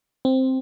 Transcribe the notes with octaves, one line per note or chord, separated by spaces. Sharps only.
C4